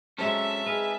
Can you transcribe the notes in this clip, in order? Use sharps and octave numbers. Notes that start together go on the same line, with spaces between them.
F#3 G#3 C4 C#4 A4 E5 A5
D#4 G#4 B4 F5